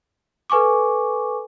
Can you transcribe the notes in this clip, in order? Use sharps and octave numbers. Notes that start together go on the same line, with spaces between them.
A4 B4 G#5 C#6 D6